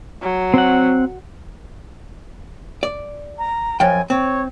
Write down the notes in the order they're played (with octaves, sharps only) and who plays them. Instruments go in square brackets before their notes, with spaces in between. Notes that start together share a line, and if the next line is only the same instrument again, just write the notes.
[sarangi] F#3
[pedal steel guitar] C4 F#5
[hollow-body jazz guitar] D5
[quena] A#5
[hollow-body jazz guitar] F#2 F3 G5 [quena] G#5
[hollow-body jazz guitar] C4 [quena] C#5